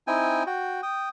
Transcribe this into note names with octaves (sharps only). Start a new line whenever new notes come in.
C4 D#4 E4 G5 G#5
F#4 G5
G5 D#6